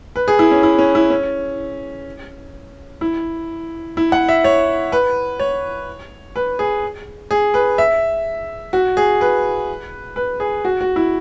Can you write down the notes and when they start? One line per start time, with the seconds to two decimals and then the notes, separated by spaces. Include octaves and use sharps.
0.16 B4
0.28 G#4
0.39 E4
0.51 C#4
0.63 E4
0.78 C#4
0.95 E4
1.10 C#4
3.01 E4
3.97 E4
4.12 F#5
4.29 E5
4.44 C#5
4.92 B4
5.40 C#5
6.36 B4
6.59 G#4
7.31 G#4
7.54 B4
7.78 E5
8.73 F#4
8.97 G#4
9.21 B4
10.16 B4
10.40 G#4
10.65 F#4
10.81 F#4
10.96 E4